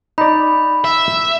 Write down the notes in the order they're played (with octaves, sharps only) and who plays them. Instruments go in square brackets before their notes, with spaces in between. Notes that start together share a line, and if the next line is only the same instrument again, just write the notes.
[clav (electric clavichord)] D#4 D5 [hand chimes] B5
[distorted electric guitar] E5